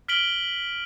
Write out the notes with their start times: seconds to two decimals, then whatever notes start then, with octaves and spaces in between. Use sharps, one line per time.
0.08 F6 B6 D7 F#7 G7